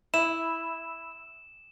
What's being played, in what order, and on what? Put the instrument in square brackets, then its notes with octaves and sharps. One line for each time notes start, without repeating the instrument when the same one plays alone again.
[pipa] E4 [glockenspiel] E7